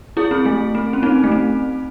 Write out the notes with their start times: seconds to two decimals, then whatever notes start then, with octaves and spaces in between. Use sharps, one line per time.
0.17 E4 G#4
0.31 C4
0.46 A3
0.75 C4
0.93 C#4
1.03 C4 D#4
1.24 A3
1.32 C4